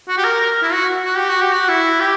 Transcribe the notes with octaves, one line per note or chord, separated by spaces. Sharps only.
F#4
G4
A#4
A#4
E4
F#4
F#4
G4
F#4
G4
F#4
E4
G4